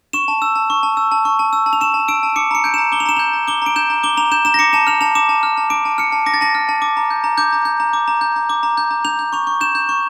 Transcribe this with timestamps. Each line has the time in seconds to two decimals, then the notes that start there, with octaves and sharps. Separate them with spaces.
0.13 C#6 E7
0.28 A5
0.42 E6
0.56 A5
0.70 C#6
0.83 A5
0.97 E6
1.12 A5
1.25 C#6
1.39 A5
1.53 E6
1.66 A5
1.73 F7
1.81 C#6 E7
1.94 A5
2.08 E6 D7
2.23 A5
2.36 D6 C#7
2.51 A#5 C#7
2.64 G6 D7
2.74 A#5 E7
2.92 D6 G7
3.00 F7
3.06 A#5 E7
3.17 G6 F7
3.33 A#5
3.48 D6 G7
3.62 A#5 D7
3.76 G6 E7
3.90 A#5
4.03 D6 G7
4.17 A#5 F7
4.32 G6 E7
4.45 A#5 E7
4.54 A#6
4.59 D6 C#7
4.73 A5 E7
4.87 F6 F7
5.01 A5 F7
5.15 D6 E7
5.29 A5
5.43 F6
5.57 A5
5.70 D6 D7
5.85 A5
5.98 F6 C#7
6.12 A5
6.26 D6 A#6
6.34 A6
6.41 A5 A#6
6.55 F6
6.69 A5
6.82 D6
6.97 A#5
7.11 G6
7.24 A#5
7.38 D6 G6
7.53 A#5
7.65 G6
7.80 A#5
7.93 D6
8.08 A#5
8.21 G6
8.36 A#5
8.50 D6
8.63 A#5
8.77 G6
8.91 A#5
9.05 G6 F7
9.19 G6
9.33 C#6 F7
9.47 C#6
9.61 G6 E7
9.75 G6
9.89 C#6